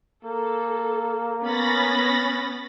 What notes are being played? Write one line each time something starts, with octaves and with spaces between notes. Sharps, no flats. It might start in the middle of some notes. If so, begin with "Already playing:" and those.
A#3 A4
B3 C#4 B5 A6 A#6